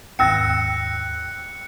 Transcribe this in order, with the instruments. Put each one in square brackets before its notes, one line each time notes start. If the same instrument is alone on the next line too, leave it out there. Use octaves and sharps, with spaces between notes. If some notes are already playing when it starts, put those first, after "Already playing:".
[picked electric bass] D#2 G#2 C4 [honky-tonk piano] G5 E6 A#6 [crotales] F#6 C#7